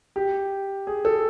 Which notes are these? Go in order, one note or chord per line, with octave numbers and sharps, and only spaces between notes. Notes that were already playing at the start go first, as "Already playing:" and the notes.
G4
G#4
A4